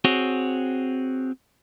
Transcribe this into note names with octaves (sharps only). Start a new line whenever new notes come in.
C4 F#4 G#4 C#5